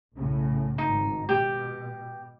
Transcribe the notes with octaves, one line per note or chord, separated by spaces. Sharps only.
B1 A2 C#3
G#1 D#4
B2 G4